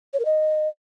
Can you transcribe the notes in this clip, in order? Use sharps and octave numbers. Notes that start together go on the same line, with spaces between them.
C#5
A#4
D#5